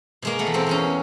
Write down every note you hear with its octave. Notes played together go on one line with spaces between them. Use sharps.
B2 G#3 A#3
A3 B3
E2
A#3 C4
E2 B3 C#4